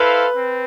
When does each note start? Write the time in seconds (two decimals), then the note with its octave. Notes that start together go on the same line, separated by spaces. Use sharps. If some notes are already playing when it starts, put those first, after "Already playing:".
Already playing: E4 A4 B4 C5 F5
0.35 C4